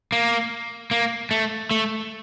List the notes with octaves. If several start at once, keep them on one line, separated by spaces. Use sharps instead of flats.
A#3
A#3
A3
A3